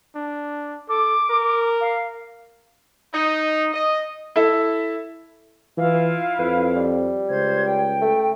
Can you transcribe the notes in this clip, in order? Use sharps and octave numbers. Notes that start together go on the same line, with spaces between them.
D4
A4 D6
A#4
F5
D#4
D#5
E4 A4 E5
E3 E4 F4 F5
F2 B4
G3
C#2 C5 G#6
G5
A3